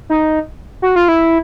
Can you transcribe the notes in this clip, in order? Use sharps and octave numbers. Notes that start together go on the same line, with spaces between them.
D#4
F#4
F4
E4